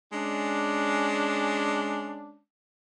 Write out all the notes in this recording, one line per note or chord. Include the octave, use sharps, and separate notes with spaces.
G#3 C#4 D4